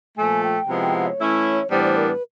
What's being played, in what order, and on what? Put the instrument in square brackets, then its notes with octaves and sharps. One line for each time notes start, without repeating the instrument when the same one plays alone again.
[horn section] A#2 F3 A3 [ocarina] G#5
[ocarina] G5
[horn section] C3 F3 G#3 B3 E4
[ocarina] G5
F#5
C#5
[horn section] E3 A3 C#4 E4
[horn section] A2 E3 G3 B3 D4 [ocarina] C5
[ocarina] C5
A#4
B4